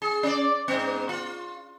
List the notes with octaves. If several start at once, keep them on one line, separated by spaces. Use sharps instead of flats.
G#4
C#4 D5
G#2 B3
F4